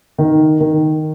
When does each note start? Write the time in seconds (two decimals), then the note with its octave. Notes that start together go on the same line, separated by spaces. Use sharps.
0.18 D#3
0.60 D#3